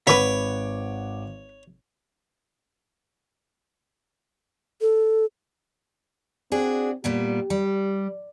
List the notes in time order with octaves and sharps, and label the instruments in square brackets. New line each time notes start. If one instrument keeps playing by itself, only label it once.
[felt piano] G#1 F#5 D6 [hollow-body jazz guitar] B4 B5 [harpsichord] C#5
[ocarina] A4
[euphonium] C4 [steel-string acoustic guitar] D4 F#4 G#4
[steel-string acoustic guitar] A#2 G3 B3 [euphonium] G4
[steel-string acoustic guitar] G3